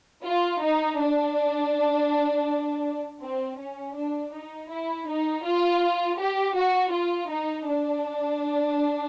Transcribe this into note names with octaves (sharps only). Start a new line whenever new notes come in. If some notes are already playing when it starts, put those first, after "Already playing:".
F4
D#4
D4
C4
C#4
D4
D#4
E4
D#4
F4
G4
F#4
F4
D#4
D4